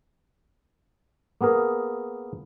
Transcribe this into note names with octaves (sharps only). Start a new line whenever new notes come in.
A#3 B3 G#4 A#4